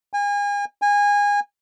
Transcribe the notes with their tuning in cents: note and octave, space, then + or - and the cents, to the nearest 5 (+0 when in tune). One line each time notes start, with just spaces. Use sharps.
G#5 -35
G#5 -25